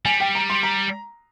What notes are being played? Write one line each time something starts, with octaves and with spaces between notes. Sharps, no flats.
G3 G#5
G5
A#5
C6
A#5